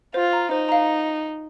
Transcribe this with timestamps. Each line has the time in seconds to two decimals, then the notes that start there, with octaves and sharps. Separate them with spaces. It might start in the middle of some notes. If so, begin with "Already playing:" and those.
0.14 F4 C5
0.33 F5 A#5
0.51 D#4 C5
0.69 F5 A#5